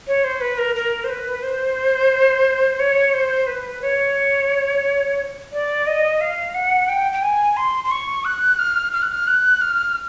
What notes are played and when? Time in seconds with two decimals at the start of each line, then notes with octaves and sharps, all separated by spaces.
0.07 C#5
0.24 C5
0.41 B4
0.58 A#4
0.75 A#4
1.04 C5
1.10 B4
1.43 C5
2.80 C#5
3.14 C5
3.47 B4
3.82 C#5
5.52 D5
5.87 D#5
6.21 F5
6.55 F#5
6.89 G5
7.12 G5
7.23 G#5
7.57 C6
7.84 C6
7.91 C#6
8.25 F#6
8.59 F6
8.93 F6
9.02 F#6
9.11 F6
9.27 F#6
9.61 F6